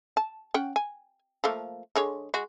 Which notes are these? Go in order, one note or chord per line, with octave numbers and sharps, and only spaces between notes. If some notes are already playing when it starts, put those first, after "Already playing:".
A5
C#4 F#5 G5
G#5
F3 A3 A#3
D3 G#3 C#5
G#3 F#4